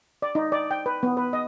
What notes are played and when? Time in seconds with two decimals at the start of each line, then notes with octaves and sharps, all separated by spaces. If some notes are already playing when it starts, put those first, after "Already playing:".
0.22 D5
0.35 D#4
0.52 D5
0.71 G5
0.86 B4
1.03 B3
1.17 B4
1.33 D#5